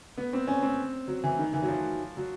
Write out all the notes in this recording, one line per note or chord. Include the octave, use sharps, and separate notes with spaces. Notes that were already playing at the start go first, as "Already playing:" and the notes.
B3
C4
C#4
C4
F#3
E3
D#3
E3
F#3
F3
F#3